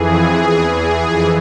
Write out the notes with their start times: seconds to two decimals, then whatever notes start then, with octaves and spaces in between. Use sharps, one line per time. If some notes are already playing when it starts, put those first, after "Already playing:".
Already playing: F2 E3 G#4
0.39 E2 E3
0.69 G#4
1.00 F2 E3